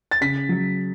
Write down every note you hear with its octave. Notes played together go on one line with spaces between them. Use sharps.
A6
C#3 B6
F#3